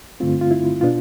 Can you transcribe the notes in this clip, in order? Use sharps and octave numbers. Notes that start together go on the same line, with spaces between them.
G2 D3 A3 C4 F4
F4
E4
B2 B3 D4 F4